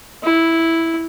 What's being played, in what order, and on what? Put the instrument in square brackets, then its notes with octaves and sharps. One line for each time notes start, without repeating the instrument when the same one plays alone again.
[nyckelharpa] E4